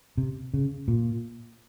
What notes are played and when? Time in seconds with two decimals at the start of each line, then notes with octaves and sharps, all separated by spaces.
0.17 C3
0.54 C#3
0.88 A#2